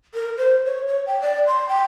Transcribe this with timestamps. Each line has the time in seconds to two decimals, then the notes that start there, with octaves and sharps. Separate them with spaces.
0.14 A#4
0.38 C5
0.65 C#5
0.88 C#5
1.07 G5
1.21 D5
1.47 C6
1.69 G5